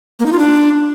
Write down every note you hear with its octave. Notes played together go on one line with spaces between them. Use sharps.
A#3
D#4
F4
D4